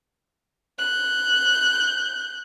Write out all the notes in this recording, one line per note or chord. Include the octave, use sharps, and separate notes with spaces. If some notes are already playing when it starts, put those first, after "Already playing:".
F#6 G6